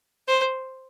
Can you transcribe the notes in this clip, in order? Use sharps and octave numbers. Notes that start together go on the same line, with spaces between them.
C5